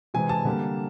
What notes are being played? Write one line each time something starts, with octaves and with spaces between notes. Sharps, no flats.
C3 E3 G#3 C4 G#5
A5
D3 G3 A#3